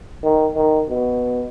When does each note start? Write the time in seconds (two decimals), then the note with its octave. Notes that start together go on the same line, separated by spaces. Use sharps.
0.23 D#3
0.55 D#3
0.89 B2